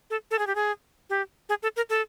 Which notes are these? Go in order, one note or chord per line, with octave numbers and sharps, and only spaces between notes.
A4
A4
G#4
G4
G#4
G4
G#4
A4
A#4
A4